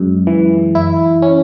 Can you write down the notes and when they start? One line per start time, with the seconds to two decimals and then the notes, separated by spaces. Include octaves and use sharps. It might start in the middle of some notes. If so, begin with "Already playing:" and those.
Already playing: F#2 G#3
0.27 E3
0.75 E4
1.22 C#4